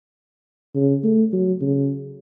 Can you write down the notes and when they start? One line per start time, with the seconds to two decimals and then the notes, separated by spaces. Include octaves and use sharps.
0.75 C#3
1.04 A3
1.33 F#3
1.61 C#3